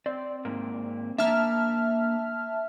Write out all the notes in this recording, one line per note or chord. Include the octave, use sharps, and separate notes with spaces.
C4 D5
G#2 A#3
A#3 D4 E5 A5 F6